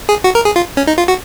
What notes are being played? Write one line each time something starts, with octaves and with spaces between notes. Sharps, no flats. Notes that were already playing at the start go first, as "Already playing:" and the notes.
G#4
F#4
A#4
G#4
F4
C#4
D#4
F4
F#4